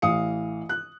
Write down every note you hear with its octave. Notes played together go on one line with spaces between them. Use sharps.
A1 E3 F5 D#6 C#7
F#6